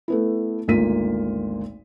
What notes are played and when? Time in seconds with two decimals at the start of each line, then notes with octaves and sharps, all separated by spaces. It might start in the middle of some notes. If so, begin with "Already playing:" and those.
0.08 A3 B3 E4
0.68 G#1 D2 A#3 F4 B6 D#7